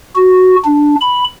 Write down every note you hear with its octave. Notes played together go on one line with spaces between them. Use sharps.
F#4
D4
B5